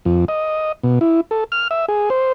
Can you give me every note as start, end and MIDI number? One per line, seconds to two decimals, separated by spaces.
0.05 0.25 41
0.28 0.72 75
0.83 0.99 47
1.01 1.21 64
1.31 1.44 69
1.52 1.68 89
1.71 1.86 76
1.88 2.09 68
2.10 2.33 72